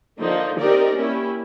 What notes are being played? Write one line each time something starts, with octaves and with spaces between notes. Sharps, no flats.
D3 F3 A#3 D#4
C4 D#4 G4 A#4 D5
A#3 C#4 E4 G4